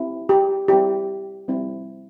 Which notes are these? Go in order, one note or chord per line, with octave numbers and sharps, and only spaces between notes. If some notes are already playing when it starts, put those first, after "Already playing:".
Already playing: C4 E4 G4
G4
G3 C4 E4 G4
G3 C4 E4